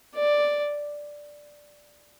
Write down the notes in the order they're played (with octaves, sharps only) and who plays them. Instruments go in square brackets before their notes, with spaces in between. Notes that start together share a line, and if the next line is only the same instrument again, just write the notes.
[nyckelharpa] D5